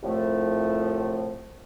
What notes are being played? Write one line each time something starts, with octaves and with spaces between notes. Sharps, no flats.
C2 A2 F3 A3